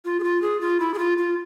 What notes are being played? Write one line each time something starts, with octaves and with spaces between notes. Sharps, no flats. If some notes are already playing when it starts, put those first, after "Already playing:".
F4
G#4
F4
G#4
F4
E4
G#4
F4
F4